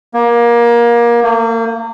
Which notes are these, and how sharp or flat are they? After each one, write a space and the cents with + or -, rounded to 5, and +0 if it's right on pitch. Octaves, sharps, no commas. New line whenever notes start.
A#3 +25
A#3 -35